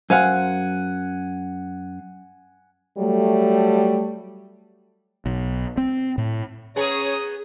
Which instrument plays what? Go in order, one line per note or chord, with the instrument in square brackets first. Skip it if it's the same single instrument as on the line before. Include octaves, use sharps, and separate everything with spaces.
[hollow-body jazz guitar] F#2 C5 F5 [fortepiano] F#5 G#5
[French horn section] F#3 G3 A3
[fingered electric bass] B1
C4
A2
[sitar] B3 G#4 [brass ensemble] C#4 C#5 [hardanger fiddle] A#5 D#6